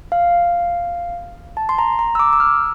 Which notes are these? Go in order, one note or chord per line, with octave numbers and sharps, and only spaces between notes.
F5
A5
C6
A#5
A#5
E6
D6
E6
F6